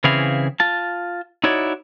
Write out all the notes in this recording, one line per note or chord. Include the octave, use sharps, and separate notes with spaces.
C#3 E3 C4 E4 G#4 F5
F4 A5
D#4 E4 F#4 C#5 D5